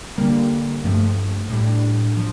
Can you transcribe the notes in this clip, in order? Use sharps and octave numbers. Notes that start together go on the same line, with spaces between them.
D3 G3 A#3
G2 F3 A3
A2 G3 D4
F3